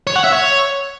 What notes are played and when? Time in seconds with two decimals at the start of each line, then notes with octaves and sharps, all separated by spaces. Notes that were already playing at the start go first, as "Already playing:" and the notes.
0.07 C#5
0.16 F#5
0.24 E5
0.32 C#5